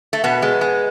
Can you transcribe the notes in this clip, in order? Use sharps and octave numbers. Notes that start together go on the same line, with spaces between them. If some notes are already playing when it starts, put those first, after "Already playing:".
A3
B2 B3
G#3
G#3